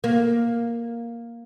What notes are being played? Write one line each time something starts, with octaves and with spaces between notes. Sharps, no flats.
A#3